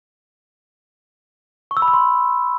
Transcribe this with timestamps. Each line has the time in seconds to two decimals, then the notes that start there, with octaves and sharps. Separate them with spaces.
1.71 C#6
1.77 E6
1.82 B5
1.88 E6
1.93 C6